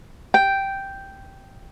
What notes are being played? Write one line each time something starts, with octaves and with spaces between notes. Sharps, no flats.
G5